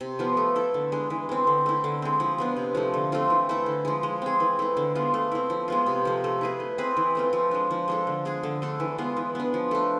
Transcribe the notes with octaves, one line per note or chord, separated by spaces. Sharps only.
C3
F3 B3 F4
A3
E4 A4
D3
G#3 D4
E3
G#3 C4
D3
A3 E4
D3
G#3 C4
F3
G#3 B3 D4
C3
F3 A3
D3
A3 C4 F4
E3
A3 E4 A4
D3
F3 G#3
G#3
C4 G#4
E3
A3 E4
D3
G#3 B3 F4
A3
C4 E4
F3
G#3 B3 F4
C3
F3 A3
A3
E4 G#4 B4
A3
C4 G#4 B4
E3
A3 C4 F4
F3
G#3 D4
F3
G#3 D4 A4
D3
G#3 D4 G#4
D3
A3 D4 A4
E3
G#3 B3 F4
E3
B3 D4
F3
A3 D4